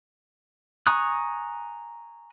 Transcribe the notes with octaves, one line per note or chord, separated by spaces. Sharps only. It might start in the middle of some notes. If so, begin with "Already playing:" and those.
G#5 A#5 C#6 D#6 F#6